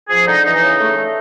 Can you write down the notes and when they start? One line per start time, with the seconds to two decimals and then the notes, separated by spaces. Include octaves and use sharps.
0.09 F3 G#4
0.27 D3 D#4
0.44 E3 D#4
0.62 C#3
0.79 A3
0.96 A3